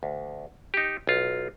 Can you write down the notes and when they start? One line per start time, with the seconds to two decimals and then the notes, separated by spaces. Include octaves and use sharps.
0.03 D2
0.74 D#4 G4
1.07 B1 F4